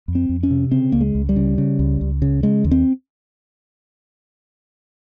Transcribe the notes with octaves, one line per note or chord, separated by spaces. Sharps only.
F2
C4
F2
C#4
C3
C#3 C4
C#2 A#3
G#3
C#2
G3
C#3
C#3
C#2
C#2
C#3
C#3 G#3
D#2
C4